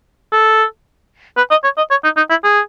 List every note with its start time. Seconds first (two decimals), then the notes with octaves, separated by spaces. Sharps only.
0.32 A4
1.37 B4
1.51 D#5
1.64 C#5
1.78 D#5
1.91 C#5
2.04 D#4
2.17 D#4
2.30 E4
2.44 G#4